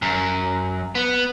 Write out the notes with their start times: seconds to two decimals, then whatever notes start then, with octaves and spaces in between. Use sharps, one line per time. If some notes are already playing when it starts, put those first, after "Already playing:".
0.02 F#2
0.95 B3